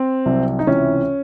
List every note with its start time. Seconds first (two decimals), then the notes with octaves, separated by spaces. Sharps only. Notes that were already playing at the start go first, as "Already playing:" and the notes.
Already playing: C4
0.26 C2 C3 F#3
0.59 D#4
0.67 C#2 C3 E3 C#4